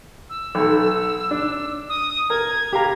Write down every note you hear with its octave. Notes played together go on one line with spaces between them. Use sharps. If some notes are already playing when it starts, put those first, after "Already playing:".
E6
B1 A4
D4
D#6
A#4 G#6
G4 F5 A#5